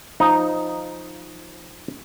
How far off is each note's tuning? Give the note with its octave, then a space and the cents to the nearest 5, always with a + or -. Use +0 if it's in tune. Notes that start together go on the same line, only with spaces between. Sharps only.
F3 +0 D#4 +0